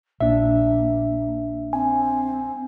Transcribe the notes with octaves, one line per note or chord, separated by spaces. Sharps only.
A#1 A#3 D4 E5
C4 G#5